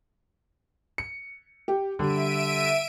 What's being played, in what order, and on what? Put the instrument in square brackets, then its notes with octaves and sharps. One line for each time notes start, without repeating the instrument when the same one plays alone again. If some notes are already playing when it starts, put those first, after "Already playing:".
[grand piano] C#7
[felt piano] G4
[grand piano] D3 [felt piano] G3 [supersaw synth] E5 D7 D#7